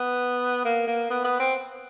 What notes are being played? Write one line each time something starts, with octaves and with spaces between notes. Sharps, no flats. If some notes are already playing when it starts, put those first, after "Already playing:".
Already playing: B3
A#3
A#3
B3
B3
C4